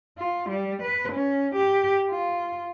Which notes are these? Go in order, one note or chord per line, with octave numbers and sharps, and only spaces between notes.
F4
G3
B4
C#4
G4
F4